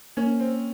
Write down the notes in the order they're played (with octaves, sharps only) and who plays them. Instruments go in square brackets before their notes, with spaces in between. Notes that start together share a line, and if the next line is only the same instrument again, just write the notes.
[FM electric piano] A#3 [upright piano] C#4
[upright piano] C4